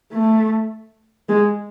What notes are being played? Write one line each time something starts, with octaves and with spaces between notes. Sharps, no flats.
A3
G#3